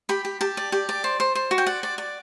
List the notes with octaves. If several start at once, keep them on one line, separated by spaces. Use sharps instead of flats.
G4 B5
G4
G4 A5
D5
G4
D5
C5
C5
C5
F#4
G5
D5 F#5
D5
D5